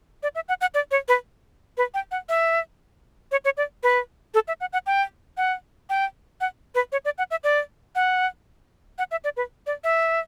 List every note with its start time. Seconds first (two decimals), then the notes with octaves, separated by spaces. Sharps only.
0.23 D5
0.35 E5
0.49 F#5
0.61 F#5
0.74 D5
0.91 C#5
1.08 B4
1.78 B4
1.94 G5
2.11 F#5
2.29 E5
3.32 C#5
3.45 C#5
3.57 D5
3.83 B4
4.34 A4
4.48 E5
4.61 F#5
4.73 F#5
4.86 G5
5.37 F#5
5.90 G5
6.41 F#5
6.75 B4
6.92 C#5
7.05 D5
7.18 F#5
7.31 E5
7.44 D5
7.95 F#5
8.98 F#5
9.11 E5
9.24 D5
9.37 B4
9.67 D5
9.84 E5